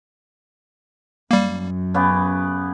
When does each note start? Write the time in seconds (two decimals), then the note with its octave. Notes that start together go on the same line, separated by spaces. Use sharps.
1.31 F#2 G3 A#3
1.94 C#3 B3 G4